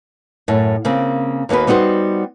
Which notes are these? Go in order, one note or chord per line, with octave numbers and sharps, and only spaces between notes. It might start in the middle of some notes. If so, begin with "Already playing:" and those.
F#2 A2
C#3 A#3 C4
D#2 A#3 B3 F#4 B4
G3 B3 D#4 F#4 C5